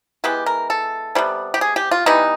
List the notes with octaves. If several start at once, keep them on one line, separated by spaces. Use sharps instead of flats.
E3 G#3 B3 G4
A#4
A4
C3 E3 G3 B3
G4
G#4
G4
F4
E3 G3 B3 D#4